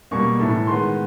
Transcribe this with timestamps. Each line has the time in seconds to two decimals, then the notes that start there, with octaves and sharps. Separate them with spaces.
0.11 B2 G3 A#3 C#6
0.39 A2 E3 A3
0.67 D#3 G#3 B3 C6